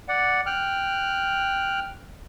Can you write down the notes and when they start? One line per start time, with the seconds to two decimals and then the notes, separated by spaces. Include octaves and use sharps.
0.08 D5 F#5
0.46 G5 F6 F#6